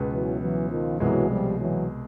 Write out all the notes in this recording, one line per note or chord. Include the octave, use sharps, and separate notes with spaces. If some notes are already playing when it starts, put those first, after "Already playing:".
Already playing: C#2 B2 G#3 B3
E3 F#3
E3 F#3
D#3 F3
C2 B2 E3 F#3 G#3
F3 G3
E3 F#3